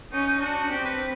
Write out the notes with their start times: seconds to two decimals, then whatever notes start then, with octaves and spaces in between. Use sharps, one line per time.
0.12 C#4 D#4
0.27 D#4
0.41 D4 F#4
0.70 C4 G4
0.85 B4